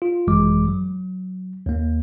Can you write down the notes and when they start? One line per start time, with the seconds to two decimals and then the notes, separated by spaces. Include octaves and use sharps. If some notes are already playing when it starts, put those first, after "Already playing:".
0.02 F4
0.27 G#1 F#2 E3 G#3 D6
0.68 F#3
1.66 D#2 A#3